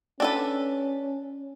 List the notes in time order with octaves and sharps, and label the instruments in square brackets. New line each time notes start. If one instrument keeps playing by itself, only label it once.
[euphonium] C#4 [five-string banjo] D4 A4 B4